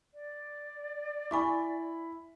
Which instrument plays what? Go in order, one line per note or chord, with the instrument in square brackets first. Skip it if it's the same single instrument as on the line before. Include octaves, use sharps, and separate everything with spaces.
[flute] D5
[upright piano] E4 B5 [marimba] G#5 C#6 D6